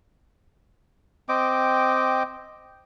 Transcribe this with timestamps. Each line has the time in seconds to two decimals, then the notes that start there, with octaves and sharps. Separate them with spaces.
1.29 C4 D#5 G5 D6